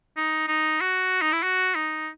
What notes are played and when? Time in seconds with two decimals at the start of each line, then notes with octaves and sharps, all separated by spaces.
0.17 D#4
0.48 D#4
0.81 F#4
1.22 D#4
1.32 E4
1.43 F#4
1.75 D#4